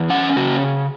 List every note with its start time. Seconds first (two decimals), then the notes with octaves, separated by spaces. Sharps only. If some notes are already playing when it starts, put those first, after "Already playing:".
Already playing: E2
0.10 C#4 F#5
0.36 C#3 F#4